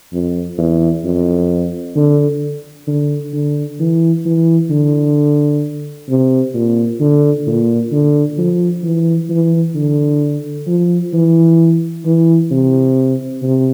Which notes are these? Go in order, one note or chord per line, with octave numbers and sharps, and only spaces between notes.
F2
E2
F2
D3
D3
D3
E3
E3
D3
C3
A#2
D3
A#2
D3
F3
E3
E3
D3
F3
E3
E3
C3
C3